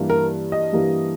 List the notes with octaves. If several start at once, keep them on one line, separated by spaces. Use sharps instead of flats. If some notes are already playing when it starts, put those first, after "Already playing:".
Already playing: G2 E3 G3 A#3
A#4
D#5
G2 E3 G3 A#3